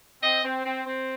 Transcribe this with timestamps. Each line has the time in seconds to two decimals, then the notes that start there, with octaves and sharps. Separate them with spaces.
0.23 C4 D#5
0.44 C4
0.65 C4
0.87 C4